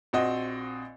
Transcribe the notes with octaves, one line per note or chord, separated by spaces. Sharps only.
A#1 C4 F#4 D#5